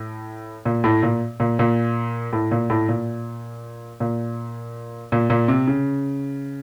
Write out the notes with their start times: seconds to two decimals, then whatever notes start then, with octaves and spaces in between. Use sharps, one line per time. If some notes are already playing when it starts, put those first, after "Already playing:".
Already playing: A2
0.65 A#2
0.84 A2
1.03 A#2
1.40 A#2
1.59 A#2
2.33 A2
2.51 A#2
2.70 A2
2.89 A#2
4.00 A#2
5.12 A#2
5.30 A#2
5.48 C3
5.67 C#3